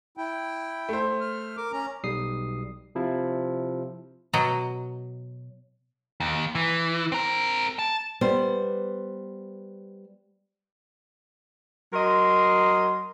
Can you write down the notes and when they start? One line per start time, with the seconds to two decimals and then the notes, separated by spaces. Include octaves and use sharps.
0.17 E4 G5
0.89 A3 C5
1.21 F6
1.57 A#4 D6
1.72 C#4 A#5
2.04 B1 G3 D#6 C7
2.95 C3 F3 E4
4.33 B2 F#3 D#5 A#5
6.20 D#2
6.55 E3
7.12 C4 A#4
7.79 A5
8.21 G3 B3 C5
11.93 F#3 A#4 D#5 C6